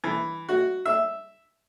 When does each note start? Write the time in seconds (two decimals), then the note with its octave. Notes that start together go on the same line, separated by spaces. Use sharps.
0.04 E3
0.49 F#4
0.86 E5